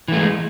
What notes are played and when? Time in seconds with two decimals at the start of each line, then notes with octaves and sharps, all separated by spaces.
0.08 E3
0.12 A3
0.16 G#3